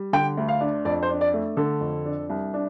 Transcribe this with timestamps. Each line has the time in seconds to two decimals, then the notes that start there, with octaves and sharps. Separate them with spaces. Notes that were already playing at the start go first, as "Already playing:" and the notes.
Already playing: G3
0.13 D3 G5
0.37 D2
0.48 F5
0.60 D4
0.85 F2 D5
1.03 C5
1.09 D4
1.21 D5
1.34 A3
1.57 D3 A4
1.81 F2
2.05 D4
2.30 C2
2.54 D4